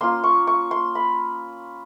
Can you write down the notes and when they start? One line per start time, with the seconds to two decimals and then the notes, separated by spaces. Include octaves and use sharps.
0.01 A#3 C#4 F4 C6
0.24 C#6
0.47 C#6
0.71 C6
0.95 B5